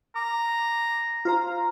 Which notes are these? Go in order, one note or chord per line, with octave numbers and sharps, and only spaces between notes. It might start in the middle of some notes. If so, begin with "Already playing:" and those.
A#5 D6
F4 C5 A#5